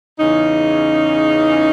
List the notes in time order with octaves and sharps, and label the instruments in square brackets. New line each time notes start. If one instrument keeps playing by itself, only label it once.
[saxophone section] E2 C#3 E3 C#4 D#4